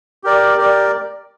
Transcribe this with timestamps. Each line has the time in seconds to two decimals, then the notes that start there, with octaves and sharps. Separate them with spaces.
0.24 G4 A#4 D5
0.57 G4 A#4 D5